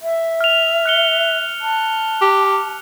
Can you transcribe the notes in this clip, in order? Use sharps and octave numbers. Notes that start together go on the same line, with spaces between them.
E5
F6 F7
F#6 C#7 G7
A5
G4